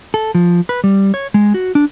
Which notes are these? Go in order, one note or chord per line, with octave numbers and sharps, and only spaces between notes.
A4
F3
B4
G3
C#5
G#3
F#4
D4